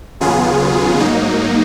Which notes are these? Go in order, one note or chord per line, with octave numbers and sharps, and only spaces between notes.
D#2 C#3 F#3 B3 F4 G#4
G#2 F#3 A#3 D#4